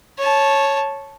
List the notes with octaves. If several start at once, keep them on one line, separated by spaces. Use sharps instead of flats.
C#5 A5